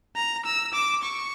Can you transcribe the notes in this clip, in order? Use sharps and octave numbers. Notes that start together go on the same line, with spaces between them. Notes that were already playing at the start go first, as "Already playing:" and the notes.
A#5
E6
D6
C#6